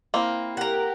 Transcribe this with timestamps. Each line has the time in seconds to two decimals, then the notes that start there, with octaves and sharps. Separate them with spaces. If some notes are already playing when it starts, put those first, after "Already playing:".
0.14 A#3 C4 E4 F5
0.57 G4 A#4 F#5 A#5